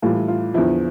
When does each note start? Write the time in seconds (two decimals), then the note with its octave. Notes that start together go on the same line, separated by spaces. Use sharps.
0.02 A2 E3 G3 F4
0.28 F4
0.54 E2 D3 F3 E4